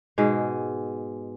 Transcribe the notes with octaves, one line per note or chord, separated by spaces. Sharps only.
G#2 B2 G#3